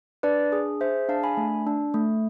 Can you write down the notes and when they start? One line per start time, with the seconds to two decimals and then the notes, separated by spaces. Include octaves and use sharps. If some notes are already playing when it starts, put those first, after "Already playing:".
0.23 D4 B4 D5
0.52 G#4
0.80 G#4 C5 E5
1.09 D4 F5 A5
1.23 G#5 B5
1.37 A3
1.67 D4
1.94 A3